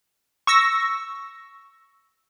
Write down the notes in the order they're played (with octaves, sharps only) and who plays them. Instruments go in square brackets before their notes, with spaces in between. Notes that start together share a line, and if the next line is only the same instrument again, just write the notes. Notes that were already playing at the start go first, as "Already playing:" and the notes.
[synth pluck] C#6 E6 A#6